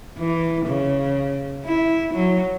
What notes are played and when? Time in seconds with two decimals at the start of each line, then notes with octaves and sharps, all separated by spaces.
0.18 E3
0.66 C#3
1.65 E4
2.13 F#3